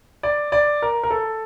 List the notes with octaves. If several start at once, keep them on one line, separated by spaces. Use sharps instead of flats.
D5
D5
A#4
A#4
A4